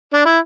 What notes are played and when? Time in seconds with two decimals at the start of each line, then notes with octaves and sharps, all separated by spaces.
0.13 D4
0.25 E4